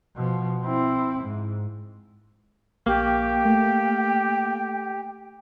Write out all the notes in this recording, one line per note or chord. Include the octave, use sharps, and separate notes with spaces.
B2 F3
C4 E4
G#2
A#1 A#3 G4 G5 C#6
A3